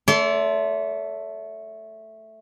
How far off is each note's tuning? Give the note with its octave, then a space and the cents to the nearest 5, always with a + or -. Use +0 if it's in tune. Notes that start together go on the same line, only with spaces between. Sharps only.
A3 +0 D5 -45 C6 +0